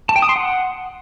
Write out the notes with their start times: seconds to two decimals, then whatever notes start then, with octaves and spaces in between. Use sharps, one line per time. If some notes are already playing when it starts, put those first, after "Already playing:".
0.09 A5
0.16 G5
0.22 D#6
0.29 C6
0.36 F#5